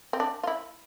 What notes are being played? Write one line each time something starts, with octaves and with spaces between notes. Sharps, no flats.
C4
D4
F4
E4